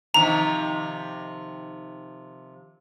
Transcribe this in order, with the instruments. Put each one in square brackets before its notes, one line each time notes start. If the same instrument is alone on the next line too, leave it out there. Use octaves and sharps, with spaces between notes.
[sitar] C3 D#3 F3 [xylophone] A#5